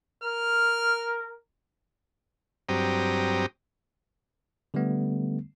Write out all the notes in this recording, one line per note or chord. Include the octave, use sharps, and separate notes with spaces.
A#4 F6
G2 F#3 C4 G4 A#5 D#6
D3 G3 A3 B3